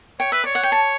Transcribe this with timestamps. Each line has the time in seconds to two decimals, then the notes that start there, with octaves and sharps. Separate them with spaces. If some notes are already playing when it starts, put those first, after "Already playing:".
0.20 C#5 G5
0.32 B4 E5
0.44 C#5 D5
0.55 F#5
0.63 G5
0.72 A5